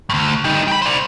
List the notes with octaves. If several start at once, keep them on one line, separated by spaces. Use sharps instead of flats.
D2 G2
G3 D#4
G5 B5
C5 D5